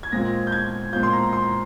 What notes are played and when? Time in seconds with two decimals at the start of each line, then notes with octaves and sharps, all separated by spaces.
0.03 G#6
0.12 A#2 G#3 C4 F4 A#6
0.47 G6
0.52 G#6
0.93 A#2 G#3 C4 F4 G6
1.03 C6
1.13 A#5
1.33 C6